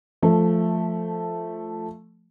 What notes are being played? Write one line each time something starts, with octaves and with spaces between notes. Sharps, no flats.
F3 A3